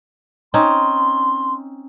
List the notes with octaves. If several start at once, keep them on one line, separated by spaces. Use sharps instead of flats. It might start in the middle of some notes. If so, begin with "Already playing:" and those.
C4 C#4 D#4 C6